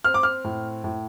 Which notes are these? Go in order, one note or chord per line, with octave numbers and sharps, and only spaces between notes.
C4 F6
D6
F6
A2
A2